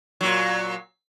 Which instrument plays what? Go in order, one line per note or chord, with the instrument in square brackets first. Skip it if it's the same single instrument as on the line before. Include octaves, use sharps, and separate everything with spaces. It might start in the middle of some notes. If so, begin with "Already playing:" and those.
[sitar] A#2 F#3